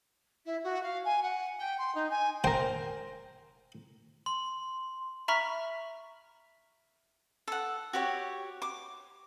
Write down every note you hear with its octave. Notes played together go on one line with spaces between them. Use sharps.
E4
F#4
F5
G#5
F#5
G5
C6
D#4
G#5
A#4 C5 G5
C6
E5 A#5 B5 C#6 F6 B6
A4 F#5
F#4 G4 C#5
D6